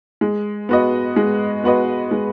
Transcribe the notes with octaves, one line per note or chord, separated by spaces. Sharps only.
G#3
B3 F#4 B4 D#5
G#3
B3 F#4 B4 D#5
G#3